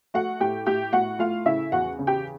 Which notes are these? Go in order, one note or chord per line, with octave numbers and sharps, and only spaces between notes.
A3 F#4 F#5
A2 G4 G5
A2 G4 G5
A2 F#4 F#5
A3 F4 F5
C#3 E4 E5
E2 F#4 F#5
C#3
G4 G5